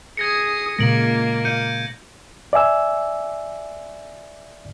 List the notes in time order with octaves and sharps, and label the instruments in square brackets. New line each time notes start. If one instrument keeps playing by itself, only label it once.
[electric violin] G#4 D#6 [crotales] G#6 A#6 C#7
[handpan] A#2 C#3 G#3 [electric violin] A#3 [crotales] A#6 D7 F#7
[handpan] F5 [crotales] G6 C#7 D#7
[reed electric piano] D5 E5 G#5 E6